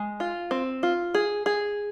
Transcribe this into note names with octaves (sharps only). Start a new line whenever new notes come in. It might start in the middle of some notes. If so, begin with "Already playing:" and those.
Already playing: G#3
F4
C4
F4
G#4
G#4